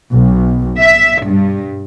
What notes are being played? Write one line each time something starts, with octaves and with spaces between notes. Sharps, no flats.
B1
E5
G2